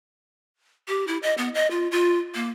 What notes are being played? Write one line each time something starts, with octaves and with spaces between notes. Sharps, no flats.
G4
E4
D#5
B3
D#5
F4
F4
A#3